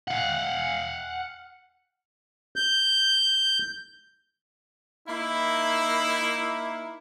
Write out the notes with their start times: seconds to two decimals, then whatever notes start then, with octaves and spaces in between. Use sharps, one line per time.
0.08 F5 F#5
2.56 G6
5.08 A#3 D#4 E4